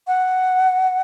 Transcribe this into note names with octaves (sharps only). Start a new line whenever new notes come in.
F#5